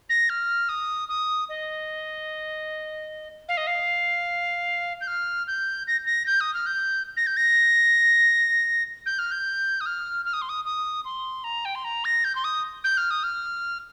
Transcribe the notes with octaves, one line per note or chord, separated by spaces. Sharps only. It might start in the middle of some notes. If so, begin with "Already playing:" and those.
A#6
F6
D#6
D#6
D#5
F5
D#5
F5
G6
F6
G6
A#6
A#6
G6
D#6
F6
G6
A#6
G6
A#6
G6
F6
G6
D#6
F6
F6
D#6
C6
D#6
D#6
C6
A#5
G5
C6
A#5
A#6
G6
C6
D#6
G6
F6
D#6
F6